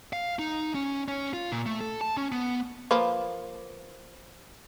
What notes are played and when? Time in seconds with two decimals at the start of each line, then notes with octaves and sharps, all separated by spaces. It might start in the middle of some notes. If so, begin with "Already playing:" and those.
0.13 F5
0.39 D#4
0.75 C#4
1.08 C#4
1.33 F4
1.52 A#2
1.66 A3
1.80 A4
2.01 A5
2.17 C#4
2.32 B3
2.91 F3 A#3 B4